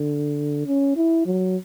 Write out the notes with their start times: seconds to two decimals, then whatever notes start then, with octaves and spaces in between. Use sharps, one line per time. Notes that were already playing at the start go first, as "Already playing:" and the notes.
Already playing: D3
0.66 C#4
0.96 E4
1.26 F#3